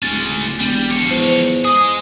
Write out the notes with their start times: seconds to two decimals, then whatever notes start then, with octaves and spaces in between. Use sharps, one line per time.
0.03 D1 G#3 C#4 A6
0.60 E1 G3
0.91 F3 C#5
1.11 E2 C5
1.65 G#4 D#5 D#6